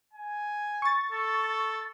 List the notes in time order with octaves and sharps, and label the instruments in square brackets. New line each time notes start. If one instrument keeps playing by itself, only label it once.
[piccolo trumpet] G#5
[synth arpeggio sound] C#6 A6
[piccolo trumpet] A4